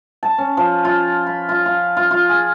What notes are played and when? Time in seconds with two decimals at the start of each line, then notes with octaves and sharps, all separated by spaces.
0.23 A5
0.38 C#4
0.57 F3
0.85 F4
1.27 B5
1.49 F4
1.66 F4
1.97 F4
2.11 F4
2.29 G#4